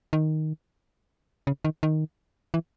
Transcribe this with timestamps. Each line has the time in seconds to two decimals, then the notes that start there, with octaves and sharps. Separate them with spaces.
0.13 D#3
1.47 C#3
1.65 D#3
1.83 D#3
2.54 E3